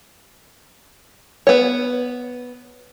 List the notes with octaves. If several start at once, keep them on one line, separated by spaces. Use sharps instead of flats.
B3 C#5